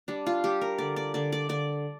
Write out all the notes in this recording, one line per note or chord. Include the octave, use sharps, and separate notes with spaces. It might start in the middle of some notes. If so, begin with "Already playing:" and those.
G3 D4
F4
G3 G4
A#4
D3 D5
D5
D3 D5
D5
D3 D5